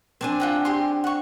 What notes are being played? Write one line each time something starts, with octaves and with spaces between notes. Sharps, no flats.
C4 D4 G#5
F4 F#5 G5
G4 G#4 C6
F#5 C#6